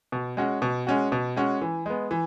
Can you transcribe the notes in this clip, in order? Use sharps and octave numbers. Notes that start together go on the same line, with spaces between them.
B2
G#3 C#4 F#4
B2
G#3 C#4 F#4
B2
G#3 C#4 F#4
E3
G#3 B3
E3